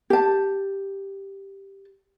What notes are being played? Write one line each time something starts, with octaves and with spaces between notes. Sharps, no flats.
G4 A5